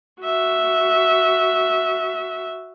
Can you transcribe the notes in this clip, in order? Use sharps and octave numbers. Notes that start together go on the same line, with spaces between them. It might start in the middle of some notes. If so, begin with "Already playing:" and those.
F#4 E5